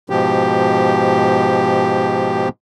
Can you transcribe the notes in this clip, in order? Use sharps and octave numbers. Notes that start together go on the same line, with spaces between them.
G#2 B2 F3 G4